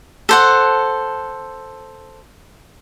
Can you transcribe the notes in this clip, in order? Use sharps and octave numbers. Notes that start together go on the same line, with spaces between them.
A4 C5 F#5